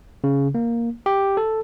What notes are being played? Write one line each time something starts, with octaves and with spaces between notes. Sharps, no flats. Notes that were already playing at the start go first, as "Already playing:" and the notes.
C#3
A#3
G4
A4